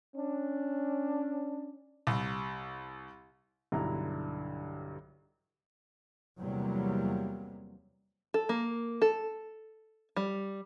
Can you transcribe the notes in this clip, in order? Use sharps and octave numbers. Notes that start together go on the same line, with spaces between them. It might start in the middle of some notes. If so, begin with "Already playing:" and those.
C#4 D4
C2
B1 G2 D3 E4 A#5
E2 C3 F#3 G3 A#3
A4
A#3
A4
G3